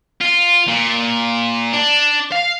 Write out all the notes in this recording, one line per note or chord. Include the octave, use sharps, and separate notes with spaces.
F4
A#2
D4
F5